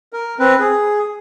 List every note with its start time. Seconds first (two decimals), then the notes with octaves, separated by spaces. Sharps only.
0.13 A#4
0.39 C4 B4
0.60 G#4